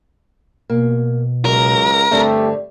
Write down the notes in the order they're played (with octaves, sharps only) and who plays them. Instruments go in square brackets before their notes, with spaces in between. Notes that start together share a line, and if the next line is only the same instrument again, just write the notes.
[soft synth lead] B2 [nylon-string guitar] A#3
[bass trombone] C#2 [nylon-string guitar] F#3 [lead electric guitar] A#4
[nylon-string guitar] G2 D3 C4 [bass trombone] A3 [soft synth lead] G4